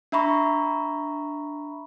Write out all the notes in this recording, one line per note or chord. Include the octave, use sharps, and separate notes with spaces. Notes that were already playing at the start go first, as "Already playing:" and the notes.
D4 E5 A#5 B5 C#6